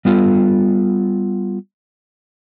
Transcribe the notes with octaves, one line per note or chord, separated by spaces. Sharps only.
G3 B3 F4 A4